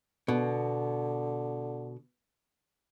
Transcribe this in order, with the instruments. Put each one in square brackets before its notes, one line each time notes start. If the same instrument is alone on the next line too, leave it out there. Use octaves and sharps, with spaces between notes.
[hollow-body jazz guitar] B2 [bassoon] D3